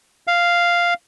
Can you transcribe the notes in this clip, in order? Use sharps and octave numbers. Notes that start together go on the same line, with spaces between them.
F5